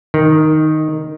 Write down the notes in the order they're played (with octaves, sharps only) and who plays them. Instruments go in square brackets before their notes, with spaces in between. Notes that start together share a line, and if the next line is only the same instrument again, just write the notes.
[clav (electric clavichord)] D#3